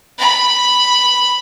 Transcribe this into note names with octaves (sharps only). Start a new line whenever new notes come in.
B5